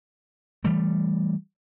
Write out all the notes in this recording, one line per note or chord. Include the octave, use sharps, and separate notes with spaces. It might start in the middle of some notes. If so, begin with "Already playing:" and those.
E3 G3 A3